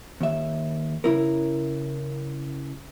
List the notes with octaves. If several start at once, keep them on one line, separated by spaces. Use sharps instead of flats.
D#2 E5
C#3 E4 A#4